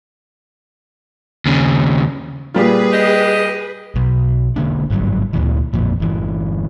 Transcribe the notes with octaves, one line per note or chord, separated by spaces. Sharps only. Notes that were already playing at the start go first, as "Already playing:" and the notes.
D#2 C#3
A#2 G3 F4 G#4 B4
G4 D#5
B1
E1 D3 A#3 D4
G#1 G2 F#3
D2 A#2 E3
A1 F2 A#2
G1 E3